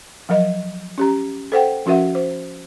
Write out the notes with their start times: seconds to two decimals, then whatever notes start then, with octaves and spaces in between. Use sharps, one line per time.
0.29 F3 F#3 A#4 D#5
0.98 C#4 G4 A#5
1.52 A4 C5 F#5 G5
1.86 F3 C#4 F#4 A#4 E5 F#5
2.15 C5